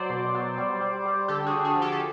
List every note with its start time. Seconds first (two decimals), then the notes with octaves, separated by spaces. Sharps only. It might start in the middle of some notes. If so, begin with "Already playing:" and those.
Already playing: F#3 C5 D5
0.10 B2
0.35 F#3
0.58 G3
0.81 G3
1.05 G3
1.28 D3 G4 A4
1.46 F#4 G#4
1.52 D3
1.64 F#4 G#4
1.76 F3
1.82 G4 A4
1.92 A4